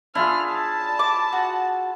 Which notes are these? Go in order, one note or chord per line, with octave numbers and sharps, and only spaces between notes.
D4 E4 F4 G#4 F6
A5
D6
F#4